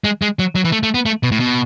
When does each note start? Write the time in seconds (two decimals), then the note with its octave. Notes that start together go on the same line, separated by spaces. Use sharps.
0.04 G#3
0.22 G#3
0.39 F#3
0.55 F#3
0.65 E3
0.72 A3
0.83 A3
0.94 B3
1.06 A3
1.23 B2
1.31 A2
1.40 B2